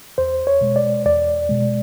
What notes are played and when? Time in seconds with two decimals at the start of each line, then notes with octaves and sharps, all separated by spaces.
0.18 E2 C5
0.47 C#5
0.61 B2 G#3
0.76 D5
1.06 E2 D5
1.49 B2 G#3